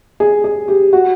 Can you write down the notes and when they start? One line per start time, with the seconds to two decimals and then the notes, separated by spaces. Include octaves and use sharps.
0.20 G#4
0.44 G#4
0.68 G4
0.93 F#4